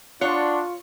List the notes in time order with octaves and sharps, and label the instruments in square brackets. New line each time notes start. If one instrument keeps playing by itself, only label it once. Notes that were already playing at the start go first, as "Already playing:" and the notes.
[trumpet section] D4 [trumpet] F4 [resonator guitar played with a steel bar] C#5 [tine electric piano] F#5 C6 C#6